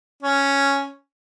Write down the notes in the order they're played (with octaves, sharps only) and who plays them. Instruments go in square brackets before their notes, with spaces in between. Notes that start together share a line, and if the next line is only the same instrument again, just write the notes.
[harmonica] C#4